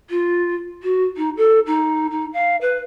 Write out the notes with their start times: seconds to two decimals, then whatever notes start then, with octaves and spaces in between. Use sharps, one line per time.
0.10 F4
0.83 F#4
1.16 D#4
1.37 A4
1.66 D#4
2.10 D#4
2.33 F5
2.61 B4